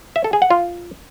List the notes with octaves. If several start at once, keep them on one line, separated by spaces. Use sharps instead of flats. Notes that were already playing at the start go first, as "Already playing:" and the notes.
E5
A4
G#4
F#5
F4